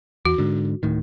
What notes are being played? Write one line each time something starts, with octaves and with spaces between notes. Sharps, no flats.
E2 F#4
G#2 D3
D1 A2 D#3